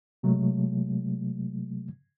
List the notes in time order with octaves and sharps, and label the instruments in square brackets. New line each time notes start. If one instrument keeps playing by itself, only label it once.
[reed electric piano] C3 F#3 G#3 A3